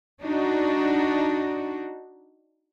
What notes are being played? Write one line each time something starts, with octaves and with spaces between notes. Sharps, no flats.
D4 D#4 F#4